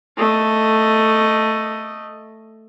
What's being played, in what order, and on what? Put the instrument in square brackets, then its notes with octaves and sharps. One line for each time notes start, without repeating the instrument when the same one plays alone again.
[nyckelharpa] A3 D#5